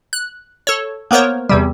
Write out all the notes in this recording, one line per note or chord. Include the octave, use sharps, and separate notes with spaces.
F#6
A4 C#5
A#3 B3 A#4 C5 C#5
E2 C3 G3